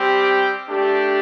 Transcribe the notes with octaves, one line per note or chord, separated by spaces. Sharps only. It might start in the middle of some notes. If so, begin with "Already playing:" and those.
Already playing: G3 C4 G4
G5
A3 D4 G4